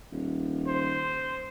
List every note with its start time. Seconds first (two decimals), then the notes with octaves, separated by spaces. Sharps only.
0.12 D#1
0.67 C5